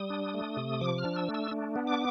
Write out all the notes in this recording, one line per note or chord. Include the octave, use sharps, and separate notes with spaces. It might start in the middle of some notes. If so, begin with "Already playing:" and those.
Already playing: G3 D#6
D4
A3
C3
F3 D6
F6
D4
E6
A3
E6
D4
B3
D6